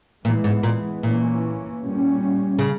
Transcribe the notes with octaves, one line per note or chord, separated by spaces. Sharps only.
A#2 E3 G#3 B3
G#2
A#2
A#2 E3 A#3 C#4
A#2 G3 C#4
C#3